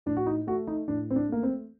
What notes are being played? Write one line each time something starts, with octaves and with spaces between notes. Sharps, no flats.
A2 D4
F#4
D#4
A3 F#4
D#4
A2 D4
C4
D4
A3 A#3
C4